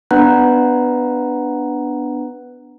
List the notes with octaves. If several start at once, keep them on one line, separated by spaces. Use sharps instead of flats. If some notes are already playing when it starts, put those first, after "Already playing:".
B3 D4 B4 F#5 A#5 F#6